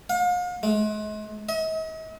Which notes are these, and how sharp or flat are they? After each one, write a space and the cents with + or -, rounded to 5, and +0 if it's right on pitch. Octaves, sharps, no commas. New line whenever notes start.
F5 +40
G#3 +40
D#5 +45